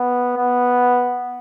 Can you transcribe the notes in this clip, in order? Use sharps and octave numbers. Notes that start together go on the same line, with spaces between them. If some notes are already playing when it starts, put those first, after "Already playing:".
Already playing: B3
B3